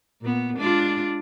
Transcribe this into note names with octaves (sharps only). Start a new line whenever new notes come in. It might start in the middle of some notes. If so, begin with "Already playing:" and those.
A#2 B3
G#3 D4 F4